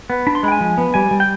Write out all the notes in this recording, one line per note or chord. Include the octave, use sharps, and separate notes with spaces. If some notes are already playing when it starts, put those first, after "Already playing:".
B3
D4 B5
C6
G#3 G5 B5
G#5
F3
B3
G3 G#5
G3
G5